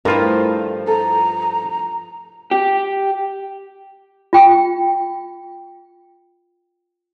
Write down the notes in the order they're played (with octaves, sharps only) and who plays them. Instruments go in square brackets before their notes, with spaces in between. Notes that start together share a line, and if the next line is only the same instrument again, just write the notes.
[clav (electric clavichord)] G2 F4 [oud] F3 A3 E4 [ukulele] A#4
[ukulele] A4 [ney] A#5
[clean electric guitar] G4
[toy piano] F4 G5